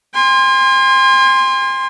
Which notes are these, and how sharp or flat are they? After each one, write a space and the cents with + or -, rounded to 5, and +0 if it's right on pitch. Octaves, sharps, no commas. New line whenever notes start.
G#5 -45 C6 +0